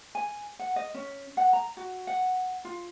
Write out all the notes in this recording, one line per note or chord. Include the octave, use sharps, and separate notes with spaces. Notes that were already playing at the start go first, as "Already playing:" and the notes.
G#5
F#5
D#5
C#4
F#5
A#5
F#4
F#5
F4